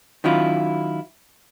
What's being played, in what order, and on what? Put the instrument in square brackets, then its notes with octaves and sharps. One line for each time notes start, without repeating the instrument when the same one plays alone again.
[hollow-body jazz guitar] D#3 F#3 C#4 E4 F4